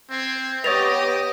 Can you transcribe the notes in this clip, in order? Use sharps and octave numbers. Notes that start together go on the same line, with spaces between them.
C4 G#6 C7
B3 G4 B4 C#5 D#5 D#6 A6 F7